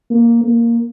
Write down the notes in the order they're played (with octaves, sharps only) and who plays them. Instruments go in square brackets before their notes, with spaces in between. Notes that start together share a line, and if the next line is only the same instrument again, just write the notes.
[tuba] A#3
A#3